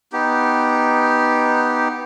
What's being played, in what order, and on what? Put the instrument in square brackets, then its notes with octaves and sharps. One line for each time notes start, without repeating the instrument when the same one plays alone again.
[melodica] B3 D#4 G4